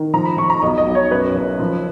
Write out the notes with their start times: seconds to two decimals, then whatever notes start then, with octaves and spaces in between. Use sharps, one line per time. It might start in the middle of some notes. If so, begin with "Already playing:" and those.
Already playing: D#3
0.14 F3 A#5
0.25 B5
0.37 F3 C#6
0.50 A#5
0.62 B1 D#5
0.78 D#5
0.87 B1
0.95 C#5
1.11 F#2 B4
1.35 F#1
1.60 F3